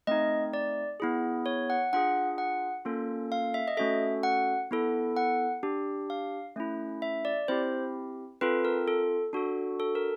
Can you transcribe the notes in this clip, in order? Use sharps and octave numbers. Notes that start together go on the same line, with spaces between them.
A3 C4 D#4 D#5
D5
B3 E4 G#4
C#5
F#5
D4 F4 G#4 F#5
F#5
A#3 C#4 F4 A4
F5
E5
D#5
A3 C#4 F#4 A4 E5
F#5
B3 E4 A4
F#5
D4 G4
F5
A3 C#4 E4
E5
D5
C4 E4 G4 C5
C4 F4 A4 B4
A#4
A4
D4 F#4 A4
A4
A#4